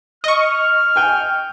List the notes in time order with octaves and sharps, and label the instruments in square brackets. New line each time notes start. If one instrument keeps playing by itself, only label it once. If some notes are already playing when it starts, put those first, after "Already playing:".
[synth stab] D#5 C#6 [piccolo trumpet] F6
[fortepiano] G5 G#5